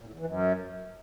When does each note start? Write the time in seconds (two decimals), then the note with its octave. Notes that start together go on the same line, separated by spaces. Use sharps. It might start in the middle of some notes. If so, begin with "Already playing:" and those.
0.01 A#2
0.07 A2
0.13 E2
0.20 E3
0.26 F#2